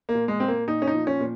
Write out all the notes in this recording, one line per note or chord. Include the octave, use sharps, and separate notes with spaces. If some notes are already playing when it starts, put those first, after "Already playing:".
A#3
A#2
G#3
A#2 C4
A#3
A#2 D#4
C#4
D#4
F3
C#4
A#2